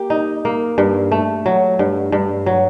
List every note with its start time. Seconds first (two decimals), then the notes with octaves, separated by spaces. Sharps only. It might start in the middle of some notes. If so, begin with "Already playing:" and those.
Already playing: A#3 G4
0.10 D#4
0.45 A#3
0.78 G2
1.12 A3
1.46 F#3
1.79 G2
2.12 G2
2.46 F#3